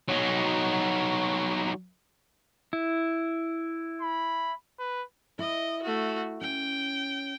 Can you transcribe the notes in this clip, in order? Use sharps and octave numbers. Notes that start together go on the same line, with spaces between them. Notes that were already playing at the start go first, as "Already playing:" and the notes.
F#3 D#4
E4
B5
B4
E4 D#5
A3 F#4
C#4 G5